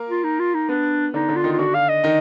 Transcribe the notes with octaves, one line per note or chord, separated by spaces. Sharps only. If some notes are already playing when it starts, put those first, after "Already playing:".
Already playing: A#3 A#4
F4
D#4
F4
D#4
B3 D4 B4
D3 D4 D#4
D3 D4
F4
D#3 D#4
F4
D3 D4 F#4
F5
D#5
D#3 D#4